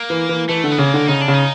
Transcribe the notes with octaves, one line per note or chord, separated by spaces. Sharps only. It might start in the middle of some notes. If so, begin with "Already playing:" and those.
Already playing: A#3
E3
E3
E3 A3
D3
B3
C#3 A#3
D3
C#3 D#4
D4
C#3
D#4